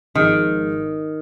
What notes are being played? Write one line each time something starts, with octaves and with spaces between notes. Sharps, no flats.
G#1 G#2 D#3 F3 G#3